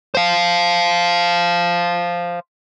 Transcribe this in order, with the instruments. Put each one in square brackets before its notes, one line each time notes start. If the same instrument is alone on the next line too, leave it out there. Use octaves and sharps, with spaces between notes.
[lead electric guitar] C5 F5